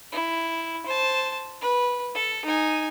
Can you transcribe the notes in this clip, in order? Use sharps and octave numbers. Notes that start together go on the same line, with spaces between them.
E4
C5 A5
B4
A4
D#4 G#5